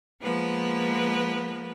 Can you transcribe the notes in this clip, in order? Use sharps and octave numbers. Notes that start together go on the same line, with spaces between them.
F3 G#3 A#3 B3 B4